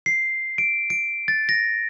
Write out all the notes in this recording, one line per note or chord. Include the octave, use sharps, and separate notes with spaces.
C7
D7
D7
A6
A#6